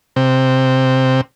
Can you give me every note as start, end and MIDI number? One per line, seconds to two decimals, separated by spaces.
0.16 1.21 48